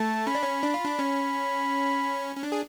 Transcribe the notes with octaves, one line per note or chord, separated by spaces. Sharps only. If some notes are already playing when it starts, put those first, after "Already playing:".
Already playing: A3 A5
C#4 B5
D4
C#4
D4
F4
D4
C#4
C#4
D4
G#4